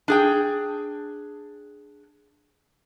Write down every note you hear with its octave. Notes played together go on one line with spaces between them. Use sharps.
D4 G#4 G5